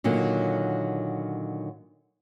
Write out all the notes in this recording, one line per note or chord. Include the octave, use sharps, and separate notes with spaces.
A#2 D3 D#3 F#3